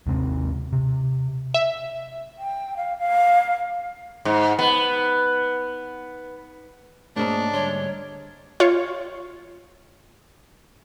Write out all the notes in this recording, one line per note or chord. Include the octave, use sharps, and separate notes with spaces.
D#2 C3 G#3 C4
C3
E5
G5
F5
F5
G#2
B3
G#2 A3 A#3 C#4 D4 G#4 A#5
D3 G3 C#5 C6
F4 C#5